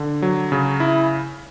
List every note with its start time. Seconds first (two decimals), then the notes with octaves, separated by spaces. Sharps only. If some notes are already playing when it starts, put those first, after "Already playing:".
Already playing: D3
0.22 F#3
0.52 C#3
0.80 E4